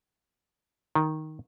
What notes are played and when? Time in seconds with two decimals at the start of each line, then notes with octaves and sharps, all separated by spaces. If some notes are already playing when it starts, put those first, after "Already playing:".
0.95 D#3